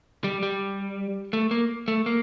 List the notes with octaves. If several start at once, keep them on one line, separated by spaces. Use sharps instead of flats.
G3
G3
A3
A#3
A3
A#3